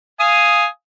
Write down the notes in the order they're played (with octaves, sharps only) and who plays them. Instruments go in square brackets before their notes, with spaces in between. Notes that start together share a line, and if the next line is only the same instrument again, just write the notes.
[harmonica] F5 G#5 D#6